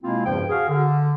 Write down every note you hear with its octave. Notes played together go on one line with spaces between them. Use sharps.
B2 G#3 A#3 C4 E4 F4
E2 G2 C#3 F3 G5
F#4 G#4 F5
D3